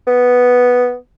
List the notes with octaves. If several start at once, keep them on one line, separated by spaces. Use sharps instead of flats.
B3